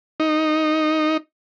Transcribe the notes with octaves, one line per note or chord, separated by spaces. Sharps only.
D#4